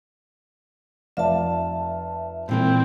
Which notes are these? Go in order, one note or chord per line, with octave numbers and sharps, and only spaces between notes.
F1 D5 E5 F5 A5
A#2 E3 A#3 C4